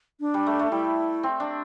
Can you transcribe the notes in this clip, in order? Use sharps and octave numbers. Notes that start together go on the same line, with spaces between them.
D4
G3
A3
A3
G3 E4
C4
D4